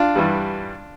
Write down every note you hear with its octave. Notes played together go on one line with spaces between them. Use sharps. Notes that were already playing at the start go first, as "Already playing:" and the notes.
Already playing: D4 F4
G2 E3 G3